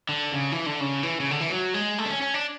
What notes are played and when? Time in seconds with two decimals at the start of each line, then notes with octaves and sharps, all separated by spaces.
0.09 D3
0.32 C#3
0.52 E3
0.66 D3
0.80 C#3
1.03 E3
1.20 C#3
1.31 D3
1.41 E3
1.50 F#3
1.74 G#3
1.98 A3
2.06 D4
2.09 C#4
2.22 C#4
2.34 D4